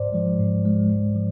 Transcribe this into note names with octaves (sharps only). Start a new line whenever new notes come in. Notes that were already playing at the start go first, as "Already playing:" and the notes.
Already playing: G#2 C5 D5
F3 G#3
G#2
F3 G#3
G#2
F3